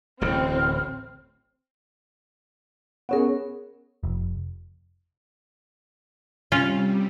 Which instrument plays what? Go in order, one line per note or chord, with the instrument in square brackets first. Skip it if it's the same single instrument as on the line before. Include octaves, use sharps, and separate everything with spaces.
[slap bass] D1 A1 C#3 [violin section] C4 [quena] F6
[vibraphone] B3 C#4 A#4 [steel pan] G#4 C#5 F#5
[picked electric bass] F1
[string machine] C3 G3 [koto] C#4 F4